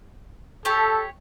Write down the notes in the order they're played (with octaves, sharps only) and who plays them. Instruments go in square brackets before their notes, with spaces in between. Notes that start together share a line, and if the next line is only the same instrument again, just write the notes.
[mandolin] G4 C#5 [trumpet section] A4